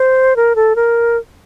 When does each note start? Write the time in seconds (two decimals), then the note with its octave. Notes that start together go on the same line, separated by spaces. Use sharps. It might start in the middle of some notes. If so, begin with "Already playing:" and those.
Already playing: C5
0.36 A#4
0.56 A4
0.76 A#4